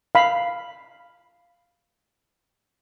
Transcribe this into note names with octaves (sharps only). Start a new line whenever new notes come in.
F5 B5